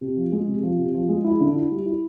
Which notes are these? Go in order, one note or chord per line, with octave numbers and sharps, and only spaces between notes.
C3
F3
G#3
C3
F3
C3
F3
G#3
E4
D3
E4
G3
E4